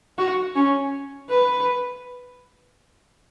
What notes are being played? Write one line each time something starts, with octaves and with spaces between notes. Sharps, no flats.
F#4
C#4
B4